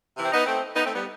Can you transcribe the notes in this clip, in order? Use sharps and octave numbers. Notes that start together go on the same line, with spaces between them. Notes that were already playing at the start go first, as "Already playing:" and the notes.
C3 E3
C4
B3 D#4
A3 C4
B3 D#4
A3 C4
G3 B3